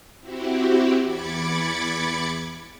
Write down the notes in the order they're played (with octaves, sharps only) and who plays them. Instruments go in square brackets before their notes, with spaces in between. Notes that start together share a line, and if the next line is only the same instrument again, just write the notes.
[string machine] C4 E4 F#4 G4
E2 B5 D6 G#6 A6 C#7